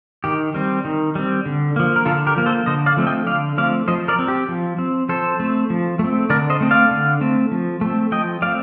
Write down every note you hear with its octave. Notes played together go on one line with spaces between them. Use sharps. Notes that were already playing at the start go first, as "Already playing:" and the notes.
D#3 G4
G3 C4
D#3
G3 C4
D3
F3 A#3
A#4
D3 F4 A4
G4 A#4
F3 A#3
A4 C5
D3 C5 D#5
D5 F5
F3 A3 C4
D#5 G5
D3 D5 F5
F3 A3 C4 D5 F5
F3 C5 D#5
A#4 D5
C4
G4
F3
C4
F3 A4 C5
A3 C4
F3
A3
C4
D3 A#4 D5
C5 D#5
A3 C4
D5 F5
D3
A3 C4
F3
A3 C4
F3 D#5 G5
A3 C4 D5 F5